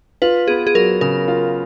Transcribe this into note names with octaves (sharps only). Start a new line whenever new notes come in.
F4 B4
B3 G#4
G#4
F#3 A#4
C#3 A#4
F4